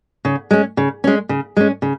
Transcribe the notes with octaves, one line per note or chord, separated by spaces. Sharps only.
C#3
G#3 C#4
C#3
G#3 C#4
C#3
G#3 C#4
C#3